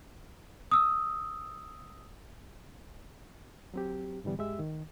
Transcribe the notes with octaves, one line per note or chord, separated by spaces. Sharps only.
D#6 E6
F#3 C4 G4
G#2 D3 E3 G3 B3
G2 G#3 G4 E5 E6
D#3